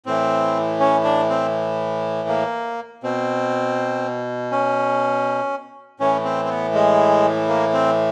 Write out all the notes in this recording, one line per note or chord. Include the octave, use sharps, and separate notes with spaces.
A2 E3 C4
C#4
D4
C4
A#3
B2 C4
C#4
A2 E3 C#4
C4
C4
B3
G#3
A#3
C4